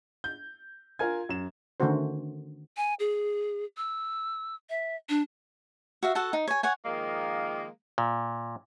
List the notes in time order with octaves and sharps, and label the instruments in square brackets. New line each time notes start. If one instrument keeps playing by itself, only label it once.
[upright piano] G6
F4 A#4 G#5 G#6
F#2 E7
[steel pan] D3 D#3 A3 C#4 F#4 C5
[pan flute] G#5
G#4
E6
E5
D4
[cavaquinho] F#4 E5 F5
F#4 A4 F#5 A5
D#4
C#5 G#5
C#5 F#5 G#5
[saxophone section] D#3 F3 G#3 A#3
[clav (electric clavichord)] A#2